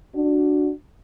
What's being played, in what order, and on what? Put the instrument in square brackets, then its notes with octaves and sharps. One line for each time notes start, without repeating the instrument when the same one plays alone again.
[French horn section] D4 F#4